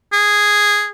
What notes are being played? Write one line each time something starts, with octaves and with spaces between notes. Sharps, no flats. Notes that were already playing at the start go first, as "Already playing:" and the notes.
G#4